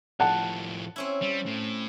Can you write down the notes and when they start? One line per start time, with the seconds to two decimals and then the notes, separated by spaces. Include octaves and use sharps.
0.20 A2 F3 F#5 A5
0.96 C4 C#4 E4
1.22 G3
1.46 A2